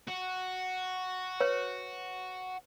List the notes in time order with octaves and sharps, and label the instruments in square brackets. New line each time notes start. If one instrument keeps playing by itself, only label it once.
[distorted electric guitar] F#4
[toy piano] B4 C#5